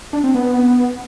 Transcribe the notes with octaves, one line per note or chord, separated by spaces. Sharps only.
D4
C4
B3